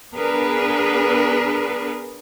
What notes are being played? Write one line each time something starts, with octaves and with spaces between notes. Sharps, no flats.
B3 D4 G#4 A#4 B4